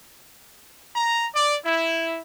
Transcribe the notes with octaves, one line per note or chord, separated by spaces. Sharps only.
A#5
D5
E4